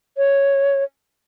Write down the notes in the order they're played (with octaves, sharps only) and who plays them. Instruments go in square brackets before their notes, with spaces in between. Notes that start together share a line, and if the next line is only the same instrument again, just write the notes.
[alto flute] C#5